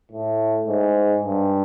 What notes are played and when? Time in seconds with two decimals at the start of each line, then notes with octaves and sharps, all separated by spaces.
0.12 A2
0.67 G#2
1.24 G2